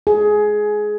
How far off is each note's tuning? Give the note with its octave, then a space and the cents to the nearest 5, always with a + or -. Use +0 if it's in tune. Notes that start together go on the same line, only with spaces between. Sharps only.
G#4 +15